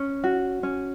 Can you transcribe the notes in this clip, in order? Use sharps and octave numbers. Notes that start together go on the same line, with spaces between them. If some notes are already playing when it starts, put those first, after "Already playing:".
Already playing: C#4
F#4
C#4